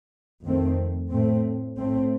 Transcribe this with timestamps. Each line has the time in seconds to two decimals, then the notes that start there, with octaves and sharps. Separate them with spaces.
0.45 F2 D#3 A3 C4
1.10 A2 A3 C4
1.75 A2 A3 C4